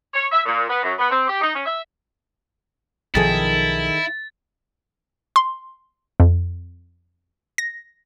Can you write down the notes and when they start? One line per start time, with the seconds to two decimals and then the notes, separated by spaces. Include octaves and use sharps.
0.13 C#5
0.32 E5
0.46 A#2
0.69 B3
0.83 F#2
0.99 B3
1.11 C4
1.28 G4
1.41 D#4
1.54 C#4
1.66 E5
3.15 B1 D#3 F3 E4 G#4 A4 A6
5.36 C6
6.20 F2
7.58 A#6